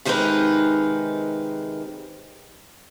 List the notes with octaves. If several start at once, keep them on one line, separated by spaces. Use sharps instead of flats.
C3 D#3 G#3 D#4 A#4 B4